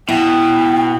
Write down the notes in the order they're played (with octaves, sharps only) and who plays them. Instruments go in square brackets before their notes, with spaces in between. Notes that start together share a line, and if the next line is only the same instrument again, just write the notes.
[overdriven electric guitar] B2 [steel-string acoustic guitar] E4 [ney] G5